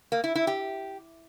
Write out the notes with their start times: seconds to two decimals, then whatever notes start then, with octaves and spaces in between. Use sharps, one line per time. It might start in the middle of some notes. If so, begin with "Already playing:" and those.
0.12 A#3
0.24 E4
0.35 E4
0.47 G4